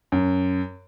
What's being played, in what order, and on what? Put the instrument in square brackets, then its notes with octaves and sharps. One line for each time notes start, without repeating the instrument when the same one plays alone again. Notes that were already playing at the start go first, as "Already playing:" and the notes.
[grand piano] F#2